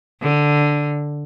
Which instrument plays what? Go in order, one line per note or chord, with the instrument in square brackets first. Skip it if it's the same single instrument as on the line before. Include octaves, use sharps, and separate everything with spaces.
[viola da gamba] D3